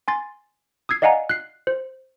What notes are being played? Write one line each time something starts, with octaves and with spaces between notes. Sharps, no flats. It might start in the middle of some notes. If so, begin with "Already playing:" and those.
G#5 C6 A6
D#6 E6 G#6 C7
D5 D#5 F5 F#5 G#5 A#5
F#6 C7
C5